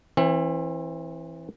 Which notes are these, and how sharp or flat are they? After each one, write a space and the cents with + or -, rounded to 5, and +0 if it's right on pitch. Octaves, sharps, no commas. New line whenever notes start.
E3 +0 C4 +35